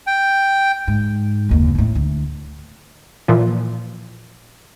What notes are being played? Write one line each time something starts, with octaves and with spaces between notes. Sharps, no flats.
G5
G#2
F#1 D#2
E2 A2
D2
A#2 E3 F3